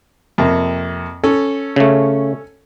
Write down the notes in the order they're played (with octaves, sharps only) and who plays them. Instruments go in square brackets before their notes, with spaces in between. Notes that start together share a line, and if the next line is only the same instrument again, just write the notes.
[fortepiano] F2 C3 A#3
C#4 A4
[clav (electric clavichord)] C#3 A3